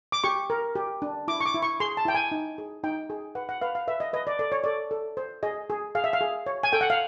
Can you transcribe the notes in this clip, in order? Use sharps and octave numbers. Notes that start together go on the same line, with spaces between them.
D6
G4 C#6
A#4
G4
D4
E4 D6
C#6
D6
E4
C#6
G#4 C6
A5
E4 G5
G#5
D#4
G#4
D#4 G5
G#4
B4 F#5
F#5
B4 F5
F5
B4 E5
D#5
B4 D#5
D5
A4 D5
C#5
A4 D5
A4
C5
G#4 D#5
G#4
G#4 F5
E5
F5
G#4
C#5
G#5
A4 G5
F#5
F5